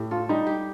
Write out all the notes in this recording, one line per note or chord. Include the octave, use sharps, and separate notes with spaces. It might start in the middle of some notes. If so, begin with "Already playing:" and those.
Already playing: A2 G4
F4 A4
G3 D#4
G4